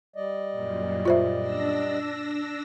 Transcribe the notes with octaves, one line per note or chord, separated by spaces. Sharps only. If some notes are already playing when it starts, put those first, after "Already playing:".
G3 D5 D#5
F#2 A#2
F4 C5 E5
D4 E6 A#6